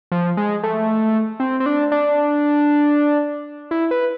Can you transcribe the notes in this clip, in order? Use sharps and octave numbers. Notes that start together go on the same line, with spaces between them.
F3
G#3
A3
C4
C4
D4
D4
E4
B4